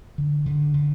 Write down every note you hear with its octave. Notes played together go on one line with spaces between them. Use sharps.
D3
D3
D3